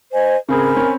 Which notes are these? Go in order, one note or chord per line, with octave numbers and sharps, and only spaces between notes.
C5 D#5 G#5
C#3 C4 G#4 A#4 G#5 B5
C4 C#4